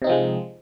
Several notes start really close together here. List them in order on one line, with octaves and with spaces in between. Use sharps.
C3 D#4 C4 F3 G#3